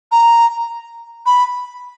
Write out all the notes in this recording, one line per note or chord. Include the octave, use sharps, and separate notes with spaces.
A#5
B5